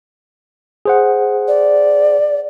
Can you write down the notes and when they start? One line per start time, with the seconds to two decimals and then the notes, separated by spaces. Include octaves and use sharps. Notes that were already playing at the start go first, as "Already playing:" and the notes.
0.85 G#4 C5 F#5
1.48 D5